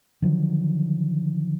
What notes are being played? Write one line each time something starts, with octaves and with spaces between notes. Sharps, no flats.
D3 D#3 F3 F#3